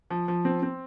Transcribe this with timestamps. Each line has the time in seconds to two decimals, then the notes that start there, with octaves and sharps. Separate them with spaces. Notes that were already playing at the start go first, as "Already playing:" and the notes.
0.10 F3
0.28 F3
0.45 C4
0.63 C4